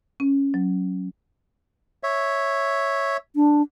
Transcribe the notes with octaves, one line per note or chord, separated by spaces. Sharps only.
C#4
F#3
C#5 E5
D4